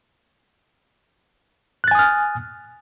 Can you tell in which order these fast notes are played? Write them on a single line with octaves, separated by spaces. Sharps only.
F#6 A6 G#5 D#6 F6